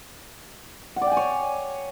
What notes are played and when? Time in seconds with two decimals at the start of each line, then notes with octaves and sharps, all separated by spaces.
0.96 F#5
1.01 D5
1.07 G5
1.12 G#5
1.17 C#5